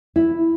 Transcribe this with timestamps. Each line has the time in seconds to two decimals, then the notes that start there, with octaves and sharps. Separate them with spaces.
0.16 E4